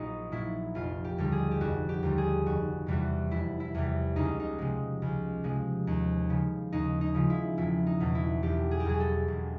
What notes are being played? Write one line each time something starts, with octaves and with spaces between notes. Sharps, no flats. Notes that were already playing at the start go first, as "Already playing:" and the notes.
Already playing: A#1 A#2 F#3 D#4
A#2 F#3 E4
F1 F4
G4
D#2 D3 G3
G#4
G4
F1 F#4
G4
D#2 D3 G3
G#4
F1 F#4
E2 C3 E3 G3 F#4
F1 E4
E4
E2 C3 E3 G3
C#2 D#4
D#4
C3 F3 G#3
C#2
C3 F3 G#3
D#2
C#3 F3
D#2 D#4
D#4
C#3 F3
E4
E1 E4
D#4
E2 B2 F#3
E4
E1 G4
G#4
G4
E2 B2 F#3 G#4
A4
E1